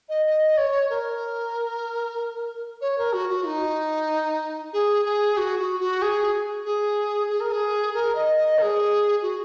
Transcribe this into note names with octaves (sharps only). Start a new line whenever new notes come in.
D#5
D#5
C#5
A#4
C#5
A#4
F#4
F#4
D#4
G#4
G#4
F#4
F#4
F#4
G#4
G#4
G#4
A#4
G#4
A#4
D#5
D#5
A#4
G#4
F#4